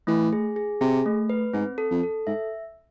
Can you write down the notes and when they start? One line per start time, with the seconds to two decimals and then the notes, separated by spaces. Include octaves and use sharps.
0.07 E3 A3
0.33 G#4
0.56 G#4
0.81 C3 G#4
1.06 A3
1.29 B4
1.53 G#2 C4
1.78 A4
1.91 F2
2.03 A4
2.27 G#2 E5